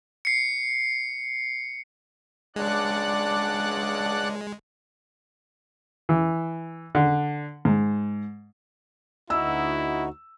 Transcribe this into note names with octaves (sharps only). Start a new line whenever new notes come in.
C7 C#7
C#2 G#3 D4 D5 F#5 F#6
E3
D3
G#2
D2 D#4 E4 F#4 E6